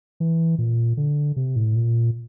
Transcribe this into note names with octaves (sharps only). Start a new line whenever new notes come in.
E3
A#2
D3
C3
A2
A#2